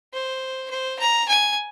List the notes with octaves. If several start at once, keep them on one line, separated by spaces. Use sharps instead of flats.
C5
C5
A#5
G#5